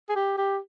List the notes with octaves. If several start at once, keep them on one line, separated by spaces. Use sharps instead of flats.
G#4
G4
G4